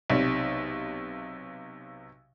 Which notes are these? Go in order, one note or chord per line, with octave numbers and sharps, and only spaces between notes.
B1 C3